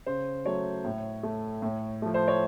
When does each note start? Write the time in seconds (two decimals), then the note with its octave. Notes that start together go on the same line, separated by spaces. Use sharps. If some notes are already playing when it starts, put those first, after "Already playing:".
0.06 C#3 C5
0.45 F#3 A3 C#5
0.85 A2
1.23 A3
1.62 A2
2.02 F3 A3
2.14 C5
2.28 C#5